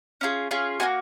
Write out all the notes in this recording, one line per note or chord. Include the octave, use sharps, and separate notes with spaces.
C#4 F4 G#4
C#4 F4 G#4
A#3 C#4 F#4 G#5